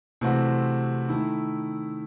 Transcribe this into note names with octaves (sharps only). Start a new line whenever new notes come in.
C3 E3 A3 C4 F#4
D#3 A3 E4